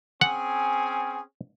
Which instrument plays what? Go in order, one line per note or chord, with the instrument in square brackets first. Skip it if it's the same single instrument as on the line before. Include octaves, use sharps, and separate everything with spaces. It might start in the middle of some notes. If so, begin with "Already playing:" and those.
[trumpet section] C4 C#4 G#4 [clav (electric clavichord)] F#5 [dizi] G#5